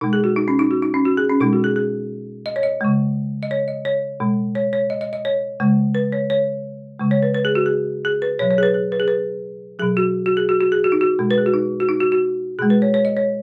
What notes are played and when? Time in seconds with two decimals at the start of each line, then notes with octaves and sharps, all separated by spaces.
0.01 B2 G#3 D#4
0.13 G#4
0.24 F#4
0.36 D#4
0.48 C#4
0.59 D#4
0.71 F#4
0.82 D#4
0.94 C#4
1.05 F#4
1.17 G#4
1.30 C#4
1.40 B2 G#3 D#4
1.53 F#4
1.64 G#4
1.76 G#4
2.46 D#5
2.56 C#5
2.63 D#5
2.81 C#3 G#3
3.43 D#5
3.51 C#5
3.68 D#5
3.85 C#5
4.20 B2 G#3
4.55 C#5
4.73 C#5
4.90 D#5
5.01 D#5
5.13 D#5
5.25 C#5
5.60 C#3 G#3
5.95 B4
6.12 C#5
6.30 C#5
6.99 C#3 G#3
7.11 C#5
7.23 B4
7.34 B4
7.45 G#4
7.55 F#4
7.66 G#4
8.05 G#4
8.22 B4
8.39 B2 F#3 C#5
8.51 C#5
8.58 G#4
8.63 B4
8.74 G#4
8.92 B4
9.00 G#4
9.08 B4
9.79 B2 F#3 G#4
9.97 F#4
10.26 F#4
10.37 G#4
10.49 F#4
10.61 F#4
10.72 G#4
10.84 F#4
10.92 D#4
11.01 F#4
11.19 B2 G#3
11.31 B4
11.38 G#4
11.46 F#4
11.54 D#4
11.80 F#4
11.89 D#4
12.01 F#4
12.12 F#4
12.59 B2 G#3 G#4
12.70 B4
12.82 C#5
12.94 C#5
13.05 D#5
13.17 C#5